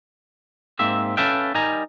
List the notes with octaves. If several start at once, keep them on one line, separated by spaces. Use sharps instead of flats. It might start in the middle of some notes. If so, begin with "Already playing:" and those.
G#2 A#3 C4 E5
C#4 A4 B4 E5 F5 G5
G3 D#4 A#4 G#5 A#5